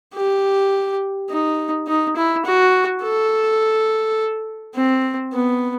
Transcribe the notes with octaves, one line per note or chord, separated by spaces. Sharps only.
G4
D#4
D#4
E4
F#4
A4
C4
B3